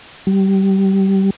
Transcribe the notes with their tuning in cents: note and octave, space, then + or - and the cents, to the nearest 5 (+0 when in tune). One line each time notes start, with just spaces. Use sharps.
G3 -20